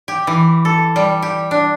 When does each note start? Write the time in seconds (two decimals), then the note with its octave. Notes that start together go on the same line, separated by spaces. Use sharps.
0.08 G4
0.27 E3
0.65 A4
0.96 G3
1.22 G4
1.51 D4